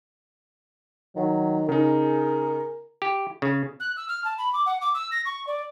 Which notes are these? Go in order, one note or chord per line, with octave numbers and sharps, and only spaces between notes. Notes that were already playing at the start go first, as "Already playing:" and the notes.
D#3 F#3
C#3 D#4 G#4 A#4
G4
C#3
F#6
E6
F6
A5
B5
D6
F#5
D6
E6
A#6
C#6
D5